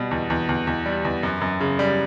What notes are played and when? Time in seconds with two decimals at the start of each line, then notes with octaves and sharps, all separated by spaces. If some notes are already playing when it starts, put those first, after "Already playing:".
Already playing: B2 G3
0.11 E2
0.30 E2
0.49 E2
0.67 E2
0.86 G3
1.05 E2
1.23 F#2
1.41 F#2
1.60 C#3
1.79 G3